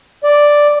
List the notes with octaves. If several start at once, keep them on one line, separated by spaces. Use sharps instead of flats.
D5